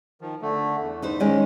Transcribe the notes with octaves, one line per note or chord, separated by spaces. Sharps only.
D#3 F3
D3 A3
E2
D#4 B4 C5
D#3 G#3 C#4